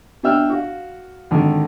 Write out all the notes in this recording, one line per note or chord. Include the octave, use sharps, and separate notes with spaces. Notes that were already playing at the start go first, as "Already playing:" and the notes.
B2 D4 E5 G5 E6 F6
F#4 F5
G#1 D3 D#3